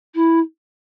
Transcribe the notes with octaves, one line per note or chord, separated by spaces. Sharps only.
E4